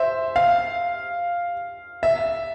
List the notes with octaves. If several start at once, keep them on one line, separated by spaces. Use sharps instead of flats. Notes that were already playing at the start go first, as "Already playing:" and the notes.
Already playing: C5 E5
F5
E5